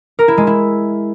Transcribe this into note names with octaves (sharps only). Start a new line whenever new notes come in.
A#4
E4
G#3
E4